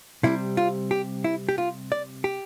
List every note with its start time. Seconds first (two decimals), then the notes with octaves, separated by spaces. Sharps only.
0.23 C3 G3 C4 E4
0.57 F4
0.91 G4
1.24 E4
1.49 G4
1.58 F4
1.92 D5
2.24 G4